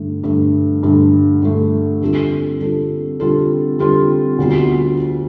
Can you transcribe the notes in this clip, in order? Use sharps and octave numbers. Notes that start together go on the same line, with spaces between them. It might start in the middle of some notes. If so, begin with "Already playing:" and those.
Already playing: G2 D3 A3
G2 D3 A3
G2 D3 A3
G2 D3 A3
D3 G3 C4 F4 A4
D3 G3 C4 F4 A4
D3 G3 C4 F4 A4
D3 G3 C4 F4 A4
D2 D3 G3 B3 F4